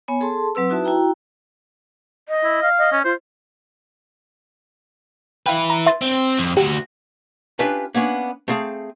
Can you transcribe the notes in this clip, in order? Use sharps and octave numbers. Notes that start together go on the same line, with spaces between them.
B3 C#5 G#5
G#4 A4 A5 C6
F#3 C4 B4 E6
D#4 E4 F#4 B4 E5 A5
E4 F#4 G5 A#5
D#5
E4
F5
D#5
C#4
F4 C5
E4 B4 F5 G5
A#5
E5 C6 A6
C4
F2
D2 F#4 G4
C#4 D4 F4 G4 B4 E5
A#3 B3 C#4 D4
A3 C4 G#4 F5 A5